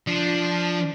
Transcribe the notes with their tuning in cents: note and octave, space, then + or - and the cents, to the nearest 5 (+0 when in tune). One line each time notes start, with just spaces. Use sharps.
F3 +0 D4 +0